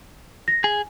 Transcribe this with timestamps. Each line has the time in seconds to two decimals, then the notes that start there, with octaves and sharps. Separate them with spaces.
0.48 A#6
0.64 G#4 G#5